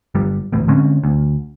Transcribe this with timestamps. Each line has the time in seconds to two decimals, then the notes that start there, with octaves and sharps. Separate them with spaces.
0.15 G1 G3
0.52 D1 G#1 A2 E3
0.68 D3 G#3 C4 C#4
1.04 D2